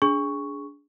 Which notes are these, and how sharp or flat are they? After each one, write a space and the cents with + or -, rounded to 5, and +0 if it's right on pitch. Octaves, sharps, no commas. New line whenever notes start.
D4 -25 G#4 +0 C#6 +0